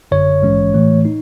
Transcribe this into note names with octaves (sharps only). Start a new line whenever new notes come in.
G#1 F#2 D3 C#5
A#1 G#2 E3 G#3 C#4
A2 E3 A3
D#4